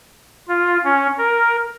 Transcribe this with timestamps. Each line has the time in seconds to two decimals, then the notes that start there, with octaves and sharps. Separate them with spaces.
0.48 F4
0.84 C#4
1.18 A#4